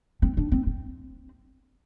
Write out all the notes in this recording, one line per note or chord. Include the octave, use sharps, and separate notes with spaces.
C4
D4
C4
C4